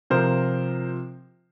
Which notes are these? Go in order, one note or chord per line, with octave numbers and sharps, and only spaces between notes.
C3 F3 A#4 C5